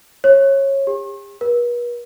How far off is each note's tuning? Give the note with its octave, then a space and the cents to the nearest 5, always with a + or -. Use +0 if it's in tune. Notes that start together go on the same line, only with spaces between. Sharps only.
C#5 -20
G4 +45
B4 -45